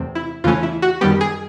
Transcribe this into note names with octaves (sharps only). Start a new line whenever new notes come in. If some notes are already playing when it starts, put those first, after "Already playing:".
Already playing: E2 C3 E3 A3 C4
E4
E2 C#3 E3 A3 C#4 F4
E4
F#4
F#2 D#3 G3 B3 G4
G#4